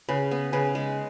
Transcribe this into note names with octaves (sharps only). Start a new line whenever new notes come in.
C#3 G#4 B4
B3
C#3 G#4 B4
G#3